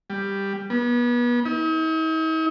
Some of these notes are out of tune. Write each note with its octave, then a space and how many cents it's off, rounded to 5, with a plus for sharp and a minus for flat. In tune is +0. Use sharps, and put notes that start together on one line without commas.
G3 +10
B3 -35
D#4 +45